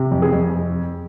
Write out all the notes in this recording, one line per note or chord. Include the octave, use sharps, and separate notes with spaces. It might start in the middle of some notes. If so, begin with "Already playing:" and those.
Already playing: C3
F2
G#4
F2